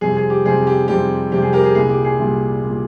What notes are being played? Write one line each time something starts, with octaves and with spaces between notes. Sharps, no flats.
F2 C3 G3 C4 G#4
G#4
G4
F2 C3 G3 C4 G#4
G4
F2 C3 G3 C4 G4
F2 C3 G3 C4 G4
G#4
G4 A#4
G#4
C2 A#2 G3 G#4
G4
G#4
C2 A#2 G3
A#2 G3